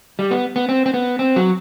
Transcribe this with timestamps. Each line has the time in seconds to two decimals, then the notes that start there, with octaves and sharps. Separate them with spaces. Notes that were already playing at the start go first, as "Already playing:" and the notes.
0.19 G3
0.31 B3
0.56 B3
0.69 C4
0.86 C4
0.94 B3
1.19 C4
1.36 F#3